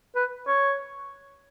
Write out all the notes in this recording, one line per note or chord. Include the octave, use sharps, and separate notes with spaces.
B4
C#5